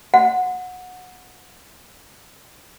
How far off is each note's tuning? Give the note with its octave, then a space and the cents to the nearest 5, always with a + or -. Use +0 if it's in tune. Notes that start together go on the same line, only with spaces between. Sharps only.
F#5 -20